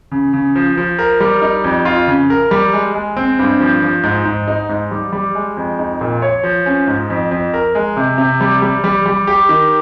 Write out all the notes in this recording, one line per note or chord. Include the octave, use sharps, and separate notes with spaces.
C#3
C#3
F3
F3
A#4
G3
D#4
F2
F4
C#3
A#4
G3
G#3
G#3
C4
G2
F3
F3
G#2
G#2
D#4
G#2
G3
G3
G#3
F2
D#4
A#2
C#5
F3
C#4
G#2
F2
F2
A#4
G#3
C3
C3
G3
G3
G3
G3
G4
D#3